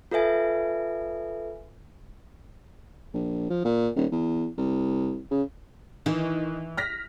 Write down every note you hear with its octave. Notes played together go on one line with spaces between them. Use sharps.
F4 A4 B4 E5 G#5
A#1
F3
A#2
D#1
E2
C2
C#3
D#3 E3
F6 A#6 B6